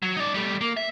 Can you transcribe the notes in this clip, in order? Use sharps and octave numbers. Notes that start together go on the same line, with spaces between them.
F#3
D#4 D5
G3 A3
A#3
E5